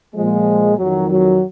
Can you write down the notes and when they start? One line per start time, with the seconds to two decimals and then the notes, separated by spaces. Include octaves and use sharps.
0.15 A#2 F3 G#3
0.78 F2 D#3 F#3
1.09 F#3